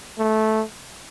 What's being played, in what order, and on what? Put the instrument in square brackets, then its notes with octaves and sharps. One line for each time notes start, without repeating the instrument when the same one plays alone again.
[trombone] A3